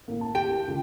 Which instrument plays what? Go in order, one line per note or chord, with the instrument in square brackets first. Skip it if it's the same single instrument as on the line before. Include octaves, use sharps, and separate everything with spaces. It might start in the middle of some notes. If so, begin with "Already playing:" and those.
[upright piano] A2 A#3
A5
[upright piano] G4 [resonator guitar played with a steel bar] G5
[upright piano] C#2